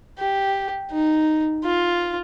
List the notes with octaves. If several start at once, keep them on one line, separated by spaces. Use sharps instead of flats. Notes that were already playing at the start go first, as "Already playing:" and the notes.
G4
D#4
F4